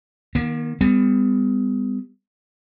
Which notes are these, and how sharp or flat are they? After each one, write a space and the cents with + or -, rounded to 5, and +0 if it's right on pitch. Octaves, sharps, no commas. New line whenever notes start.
D#3 +0 A#3 +45
G3 +35 B3 +30